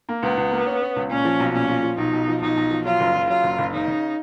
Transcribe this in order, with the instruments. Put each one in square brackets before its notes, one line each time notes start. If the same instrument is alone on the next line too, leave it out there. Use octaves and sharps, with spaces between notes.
[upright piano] A#3
[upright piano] C#2 [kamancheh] B3
[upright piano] C#2
A#3
C#4
C#4
C#2
[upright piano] A#2 [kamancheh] C#4
[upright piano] F3
B1
[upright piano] A#2 [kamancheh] C#4
[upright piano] F3
F3
[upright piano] B1 [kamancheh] D#4
[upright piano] B1
F3
[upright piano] B1 [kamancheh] D#4
[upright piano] B1
F3
[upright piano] F#3 [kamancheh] F4
[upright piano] F#1
C#3
[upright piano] F#3 [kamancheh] F4
[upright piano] F#1
F#1
[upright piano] C#3 [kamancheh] D#4
[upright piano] C#3